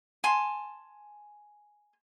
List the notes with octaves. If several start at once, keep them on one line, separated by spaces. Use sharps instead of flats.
G#5 A5 C6